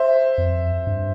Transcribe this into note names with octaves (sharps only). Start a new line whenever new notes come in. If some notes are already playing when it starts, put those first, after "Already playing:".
Already playing: C5 E5
F2
G2